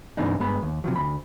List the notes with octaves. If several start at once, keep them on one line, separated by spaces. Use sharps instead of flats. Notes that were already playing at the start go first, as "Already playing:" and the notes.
G2 C3 E3 B3 D4 D#4
G2 G#3 B3 B5
D#2
C3 D#3 F3 F#3
D2 B5